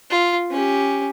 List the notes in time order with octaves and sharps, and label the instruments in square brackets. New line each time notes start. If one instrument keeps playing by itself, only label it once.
[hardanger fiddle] F4
C#4 G4